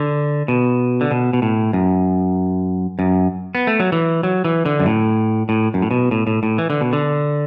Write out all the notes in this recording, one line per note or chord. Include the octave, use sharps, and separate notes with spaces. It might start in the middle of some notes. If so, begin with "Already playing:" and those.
Already playing: D3
B2
D3
B2
B2
A2
F#2
F#2
B3
A3
F#3
E3
F#3
E3
D3
F#2
A2
A2
F#2
A2
B2
A2
A2
A2
E3
D3
B2
D3